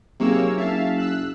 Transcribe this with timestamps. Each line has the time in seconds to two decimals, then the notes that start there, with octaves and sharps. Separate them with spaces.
0.20 C3 F#3 A#3 D#4 G#4 C#5 E6
0.57 F#1 E5 F5 A5
0.98 E6 F#6